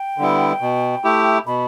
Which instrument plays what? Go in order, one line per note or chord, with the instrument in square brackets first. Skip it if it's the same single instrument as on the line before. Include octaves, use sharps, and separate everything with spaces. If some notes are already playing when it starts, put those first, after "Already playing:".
Already playing: [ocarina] G5
[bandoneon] D3 G3 B3 E4
B2
A3 E4 G4
[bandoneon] B2 [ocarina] B5